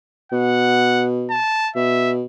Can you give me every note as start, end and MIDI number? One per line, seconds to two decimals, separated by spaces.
0.32 1.39 47
0.32 1.06 78
1.30 1.70 81
1.76 2.26 47
1.76 2.12 76